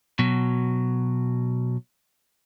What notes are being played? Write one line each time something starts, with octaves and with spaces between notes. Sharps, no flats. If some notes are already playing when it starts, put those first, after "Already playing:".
B2 F#3